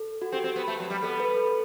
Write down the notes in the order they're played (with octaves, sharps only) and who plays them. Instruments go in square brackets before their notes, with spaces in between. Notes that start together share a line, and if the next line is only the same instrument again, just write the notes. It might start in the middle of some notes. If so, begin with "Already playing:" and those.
Already playing: [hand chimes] A4
F#4
[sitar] C4 [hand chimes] G4
[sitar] C4
B3
A3
F#3
G3
[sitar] B3 [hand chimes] A4
[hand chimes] B4
A4